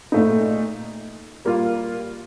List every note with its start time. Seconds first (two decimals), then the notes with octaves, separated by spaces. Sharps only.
0.12 A#2 A3 D#4
1.45 G3 A#3 F4